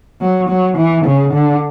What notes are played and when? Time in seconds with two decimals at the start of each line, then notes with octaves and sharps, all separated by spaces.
0.21 F#3
0.49 F#3
0.77 E3
1.05 C#3
1.33 D3